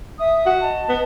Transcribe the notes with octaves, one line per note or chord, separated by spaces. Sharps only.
E5 D#6
F#4
D#5 A5
B3